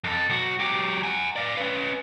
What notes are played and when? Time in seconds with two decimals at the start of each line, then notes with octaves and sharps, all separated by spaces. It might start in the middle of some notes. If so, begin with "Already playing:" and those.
0.04 F2 A4
0.30 B1 F#4
0.60 F#3 G4
1.03 F#5 G#5
1.36 D5 F5
1.57 C#4 B4